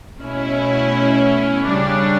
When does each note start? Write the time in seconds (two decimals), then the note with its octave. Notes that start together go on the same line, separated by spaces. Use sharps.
0.21 B2 A3 C#4 E4
1.67 C#3 G3 D4